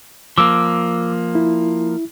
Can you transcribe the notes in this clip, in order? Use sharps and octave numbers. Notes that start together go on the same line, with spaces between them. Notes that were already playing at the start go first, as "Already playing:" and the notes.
F3 A#3 D6 E6
E4